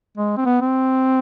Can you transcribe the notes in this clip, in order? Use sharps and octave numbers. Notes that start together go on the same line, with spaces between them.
G#3
C4
B3
C4